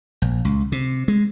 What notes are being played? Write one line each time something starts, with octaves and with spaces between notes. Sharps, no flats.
A#1
C#2
C3
G#3